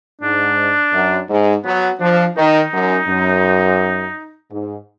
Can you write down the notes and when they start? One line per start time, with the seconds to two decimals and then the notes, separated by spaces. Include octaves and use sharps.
0.21 G#2 D4
0.93 F#2
1.29 G#2
1.64 F#3 B3
2.00 F3 D4
2.36 D#3 D#4
2.72 F#2
3.07 F#2
4.50 G#2